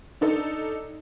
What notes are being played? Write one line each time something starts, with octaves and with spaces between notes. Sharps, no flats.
D4 D#4 A4